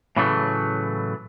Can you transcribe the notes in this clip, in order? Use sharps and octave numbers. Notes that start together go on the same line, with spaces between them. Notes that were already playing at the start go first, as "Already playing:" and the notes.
A2 C#3 E3 F#3 A3